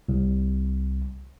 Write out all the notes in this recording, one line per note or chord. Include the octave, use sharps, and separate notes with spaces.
C2